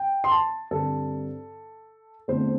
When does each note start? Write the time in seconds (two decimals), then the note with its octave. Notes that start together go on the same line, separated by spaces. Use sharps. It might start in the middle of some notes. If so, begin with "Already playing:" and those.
Already playing: G5
0.24 C6
0.31 A5
0.71 G2 D3 C4 A4
2.28 E2 D3 A3 C4 C5